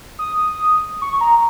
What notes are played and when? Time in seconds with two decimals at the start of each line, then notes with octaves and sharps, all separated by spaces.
0.19 D#6
1.02 C#6
1.21 A#5